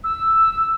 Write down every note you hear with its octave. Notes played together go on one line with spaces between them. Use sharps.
E6